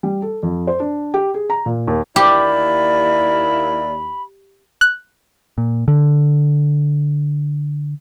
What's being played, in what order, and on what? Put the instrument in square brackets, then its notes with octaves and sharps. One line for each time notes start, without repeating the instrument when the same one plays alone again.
[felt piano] G3
A4
F2
C5
D4
G4
G#4
A#5
A#2
D#2
[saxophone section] D#2 A#3 E4 [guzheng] G4 [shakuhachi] D5 [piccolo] B5
[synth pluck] F#6
[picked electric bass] A#2
D3